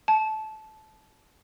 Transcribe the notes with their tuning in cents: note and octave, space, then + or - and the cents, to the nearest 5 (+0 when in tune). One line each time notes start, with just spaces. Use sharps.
A5 -20